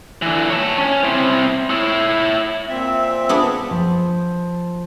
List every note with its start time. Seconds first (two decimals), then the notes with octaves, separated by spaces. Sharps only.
0.22 D3 E3
0.50 C#5 A5
0.78 C#4
1.04 C4 E4
1.70 E4 C#5
2.68 A#2 C4 E5
3.29 B3 D4 G#4
3.71 F3